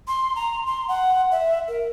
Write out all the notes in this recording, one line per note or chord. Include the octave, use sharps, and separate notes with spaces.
C6
A#5
C6
F#5
E5
A#4